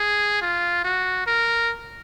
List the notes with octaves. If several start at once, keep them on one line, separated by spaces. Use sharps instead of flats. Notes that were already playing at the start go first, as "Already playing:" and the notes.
Already playing: G#4
F4
F#4
A#4